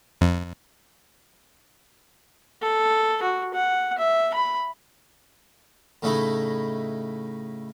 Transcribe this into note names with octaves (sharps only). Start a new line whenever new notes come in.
F2
A4
F#4
F#5
E5
B5
A2 C#3 A3 D#4 E4